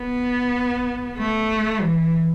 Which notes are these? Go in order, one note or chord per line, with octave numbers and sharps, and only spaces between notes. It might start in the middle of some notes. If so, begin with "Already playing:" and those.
Already playing: B3
A3
E3